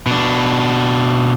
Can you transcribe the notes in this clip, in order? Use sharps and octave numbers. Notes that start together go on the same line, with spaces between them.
B2 D4